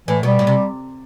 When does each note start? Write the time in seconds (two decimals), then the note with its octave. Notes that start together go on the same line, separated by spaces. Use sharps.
0.08 A2 E3
0.23 B2 G3
0.39 A2
0.47 C3